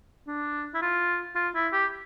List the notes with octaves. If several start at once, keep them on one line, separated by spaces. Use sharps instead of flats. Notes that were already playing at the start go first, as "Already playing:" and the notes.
D4
E4
F4
F4
E4
G4